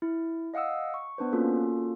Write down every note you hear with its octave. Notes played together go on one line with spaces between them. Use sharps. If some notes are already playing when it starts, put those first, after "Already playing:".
E4
D#5 F5 F#5 D#6 E6
C#6
B3 D4 B4 C5
A#3 C#4 F4 F#4 A4